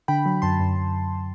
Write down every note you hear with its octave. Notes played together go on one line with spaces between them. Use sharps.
D3 G5 B5
F#3
F#2 A5 C6
F#2
F#2